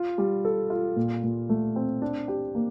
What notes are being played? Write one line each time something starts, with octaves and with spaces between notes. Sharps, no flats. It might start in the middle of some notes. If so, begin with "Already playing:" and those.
Already playing: F4
G3
A4
F4
A#2
A#2
A3
C4
D4
G4
A#3